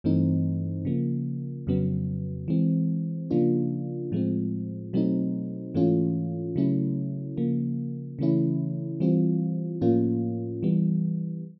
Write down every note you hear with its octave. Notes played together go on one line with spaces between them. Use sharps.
G2 E3 A3 C4 D#4
C#3 F3 A#3
F2 C#3 F#3 B3
E3 G#3 C4
C#3 F3 A#3 D4 F4
A2 F3 G#3 C4
B2 F#3 A3 C4 D#4
G#2 E3 A3 C#4 F4
C#3 F#3 A3 C#4 E4
C#3 F3 A#3
C#3 E3 A3 C#4 E4
E3 G3 C4 F4
A2 F3 A#3 C#4 F4
E3 G3 B3